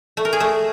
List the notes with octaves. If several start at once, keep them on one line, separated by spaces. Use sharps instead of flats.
A3
A#4
G#4
A3